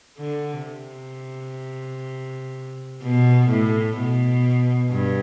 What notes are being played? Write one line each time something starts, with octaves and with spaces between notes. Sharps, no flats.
D3
C3
B2
A2
B2
G2